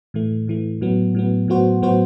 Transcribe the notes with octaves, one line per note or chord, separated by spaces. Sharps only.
A2 E3 A3
A2 E3 A3
A2 F#3 B3
A2 F#3 B3
A2 F#3 B3 F#4 C5
A2 F#3 B3 F#4 C5